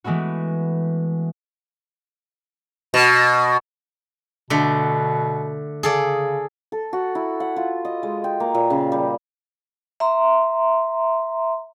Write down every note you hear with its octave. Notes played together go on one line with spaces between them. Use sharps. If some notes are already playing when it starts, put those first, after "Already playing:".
E3 G#3 A3 B3 F#4
B2
B2 D3 A3
C#3 G#4 A4 D5
A4
F#4
E4
F#5
F4
D#5
G#3
G5
A#3
A#2
C#3
G3
E5 A#5 C6